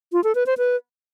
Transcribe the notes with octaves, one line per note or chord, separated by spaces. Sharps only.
F4
A4
B4
C5
B4